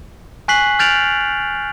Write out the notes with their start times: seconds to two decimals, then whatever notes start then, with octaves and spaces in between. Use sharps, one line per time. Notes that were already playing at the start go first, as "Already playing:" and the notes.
0.48 G#5 C#6 F#6 B6 C7 F#7
0.79 F6 G6 A6 D7 F7 F#7